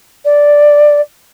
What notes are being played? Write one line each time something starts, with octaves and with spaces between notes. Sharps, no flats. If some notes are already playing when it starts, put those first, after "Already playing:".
D5